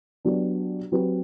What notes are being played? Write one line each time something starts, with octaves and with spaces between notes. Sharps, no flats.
F#3 B3 D4 G4
F#3 C4 G4 B4